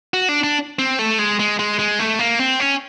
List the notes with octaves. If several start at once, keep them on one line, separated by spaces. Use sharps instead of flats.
F#4
D4
D4
C4
A3
G#3
G#3
G#3
G#3
A3
A#3
C4
C#4